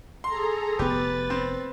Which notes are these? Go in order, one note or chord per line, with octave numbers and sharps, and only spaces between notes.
G#4 A4 A#5 C6
F1 B3 G4 B4 A6
C4